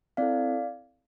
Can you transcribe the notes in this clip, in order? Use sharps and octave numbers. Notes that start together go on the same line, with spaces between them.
C4 E4 A4 D5 F5